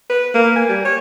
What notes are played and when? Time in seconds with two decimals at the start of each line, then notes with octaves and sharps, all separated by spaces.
0.10 B4
0.34 A#3
0.56 G#5
0.69 G3
0.85 C#5